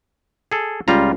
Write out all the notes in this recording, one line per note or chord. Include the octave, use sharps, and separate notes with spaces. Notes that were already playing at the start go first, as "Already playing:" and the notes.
G#4 A4
C#2 G3 F4 A#5